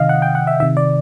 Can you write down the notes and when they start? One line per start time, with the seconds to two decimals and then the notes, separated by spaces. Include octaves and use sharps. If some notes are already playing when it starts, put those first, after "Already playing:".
Already playing: C3 D#3 D#5 F5
0.09 F#5
0.22 G5
0.35 F#5
0.47 E5
0.60 C3 D#3 E5
0.77 D5